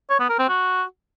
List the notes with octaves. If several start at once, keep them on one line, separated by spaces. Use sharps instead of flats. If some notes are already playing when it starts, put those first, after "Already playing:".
C#5
B3
A#4
C4
F#4